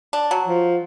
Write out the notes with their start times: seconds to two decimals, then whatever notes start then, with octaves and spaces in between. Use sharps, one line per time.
0.13 D4
0.31 F#3
0.46 F3